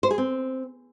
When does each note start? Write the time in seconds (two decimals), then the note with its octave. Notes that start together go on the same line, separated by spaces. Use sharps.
0.03 C5
0.11 G#4
0.18 C4